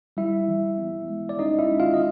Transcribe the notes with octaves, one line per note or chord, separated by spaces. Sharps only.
G3 E4 E5
E3
B3
G#3
D5
C#4 D#4 D#5
E4 E5
G#3
F4 F5
D#5